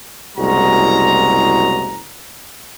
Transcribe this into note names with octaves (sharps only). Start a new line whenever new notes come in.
F#1 C2 G#3 F#4 A#5